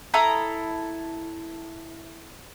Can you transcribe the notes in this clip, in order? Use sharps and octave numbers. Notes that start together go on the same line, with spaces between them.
E4 A4 A#5 D#6